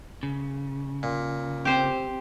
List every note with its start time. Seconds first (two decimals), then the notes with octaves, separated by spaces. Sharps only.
0.23 C#3
1.03 A#2
1.65 C4 G4 C5